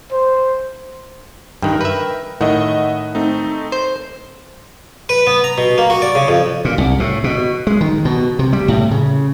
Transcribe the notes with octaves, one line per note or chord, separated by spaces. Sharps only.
C5
G2 D#3 A#4 G5
B4 E5
A2 D#3 D#5 E5 F#5
A3 C4 D#4
C5
B4
B3
A#5
B2
A#3
F#4
D5
C#3
F2
A#2
C2
A2
B2
G#3
D#3
B2
C3
G3
A2
C#3